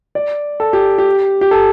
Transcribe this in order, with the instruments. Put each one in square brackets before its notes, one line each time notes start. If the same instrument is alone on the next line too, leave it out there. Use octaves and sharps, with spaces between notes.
[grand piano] D5
A4
G4
G4
G4
A4